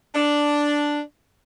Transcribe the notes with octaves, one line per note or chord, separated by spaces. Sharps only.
D4